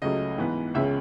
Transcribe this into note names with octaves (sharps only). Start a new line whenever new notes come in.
C#2 C#3 F#3 A3 D#5
G#2 E3 B3
C#2 C#3 G#3 C#4 E5